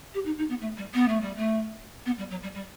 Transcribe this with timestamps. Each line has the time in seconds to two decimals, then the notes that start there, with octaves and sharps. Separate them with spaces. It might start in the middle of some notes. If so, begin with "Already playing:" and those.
0.14 G4
0.25 D#4
0.38 D#4
0.49 B3
0.61 A3
0.77 G3
0.94 B3
1.08 A3
1.21 G3
1.36 A3
2.06 B3
2.18 G3
2.30 F#3
2.42 G3
2.54 G3